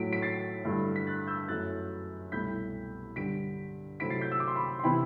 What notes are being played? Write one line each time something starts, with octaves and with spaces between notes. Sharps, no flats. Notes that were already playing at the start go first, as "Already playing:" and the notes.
Already playing: A2 F#3 A3 B6 D7
B6 D7
A6 C7
G2 D3 A3 E4
B6
F#6 A6
E6 G6
F#2 F#3 A3 E4 F#6 A6
C2 B2 A3 E4 G6 B6
G2 D3 G3 B6 D7
C3 F#3 A3 C4 E4 B6 D7
A6 C7
G6 B6
E6
D6
C6
B5 D6
C6
C3 E3 B3 E4 G5 B5